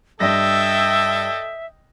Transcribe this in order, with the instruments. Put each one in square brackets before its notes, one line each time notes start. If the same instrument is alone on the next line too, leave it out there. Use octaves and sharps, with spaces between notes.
[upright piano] G2 A#6 [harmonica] A4 [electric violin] D#5 G5 [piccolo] E5